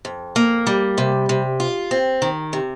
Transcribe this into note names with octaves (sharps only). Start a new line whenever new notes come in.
F2
A#3
G3
C3
C3
F4
C4
D#3
C3